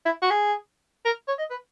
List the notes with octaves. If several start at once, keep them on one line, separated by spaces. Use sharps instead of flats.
E4
F#4
G#4
A#4
C#5
D#5
B4